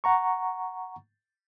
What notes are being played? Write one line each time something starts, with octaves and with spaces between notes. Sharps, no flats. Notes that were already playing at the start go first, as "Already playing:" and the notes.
F#5 A#5 C#6